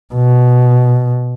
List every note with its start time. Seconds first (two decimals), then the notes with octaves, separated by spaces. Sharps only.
0.15 B2